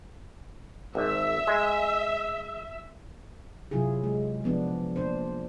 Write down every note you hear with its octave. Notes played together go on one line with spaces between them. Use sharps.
G#1 E5
G#3
C3 F#3 E4 F4 G#4
G#3
F3 B3 D4
A#2 D4 C5